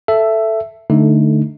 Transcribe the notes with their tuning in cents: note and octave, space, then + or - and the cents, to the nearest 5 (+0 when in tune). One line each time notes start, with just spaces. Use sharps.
A4 +0 E5 +10
D3 +5 A3 -10 D#4 +0